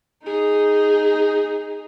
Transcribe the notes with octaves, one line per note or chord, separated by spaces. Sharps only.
D#4 G#4